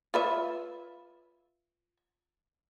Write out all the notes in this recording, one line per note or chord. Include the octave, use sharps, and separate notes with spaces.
F4 B4 E5